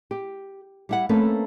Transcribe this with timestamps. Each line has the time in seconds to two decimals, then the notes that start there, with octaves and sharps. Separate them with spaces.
0.11 G4
0.89 G3 E4 F#5
1.09 A3 A#3 C4 C#4 A4 B4